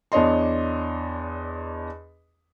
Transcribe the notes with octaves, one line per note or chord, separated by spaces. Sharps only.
E2 D4 C#5 D#5 C6